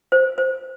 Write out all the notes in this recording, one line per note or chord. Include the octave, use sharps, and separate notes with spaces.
C5
C5